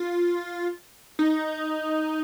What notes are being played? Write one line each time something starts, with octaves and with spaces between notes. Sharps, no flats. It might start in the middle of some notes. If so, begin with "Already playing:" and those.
Already playing: F4
D#4